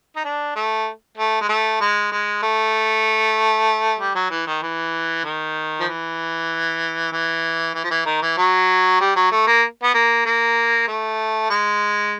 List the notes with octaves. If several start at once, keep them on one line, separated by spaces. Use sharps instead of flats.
D#4
D4
A3
A3
G#3
A3
G#3
G#3
A3
G3
F#3
E3
D#3
E3
D#3
F3
E3
E3
E3
F3
E3
D#3
E3
F#3
G3
F#3
A3
A#3
B3
A#3
A#3
A3
G#3